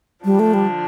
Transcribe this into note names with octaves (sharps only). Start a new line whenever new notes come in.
D3 F3 G3 D4
A3
G3